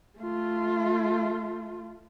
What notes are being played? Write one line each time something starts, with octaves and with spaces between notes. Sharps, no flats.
A3 F4